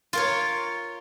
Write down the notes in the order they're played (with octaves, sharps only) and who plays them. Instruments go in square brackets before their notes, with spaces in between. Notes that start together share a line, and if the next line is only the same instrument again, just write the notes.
[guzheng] F4 A#4 C#5